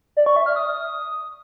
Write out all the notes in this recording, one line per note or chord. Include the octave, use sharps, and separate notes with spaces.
D5
C#6
E5
F6
D#6